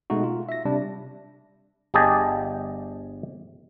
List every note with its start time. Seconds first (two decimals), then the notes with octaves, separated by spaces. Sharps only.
0.10 B2 G#3 A3 D#4 F#4
0.23 F4
0.49 E5 A#6
0.65 C3 G3 D4
1.94 G1 G4 G#4 D#5 A5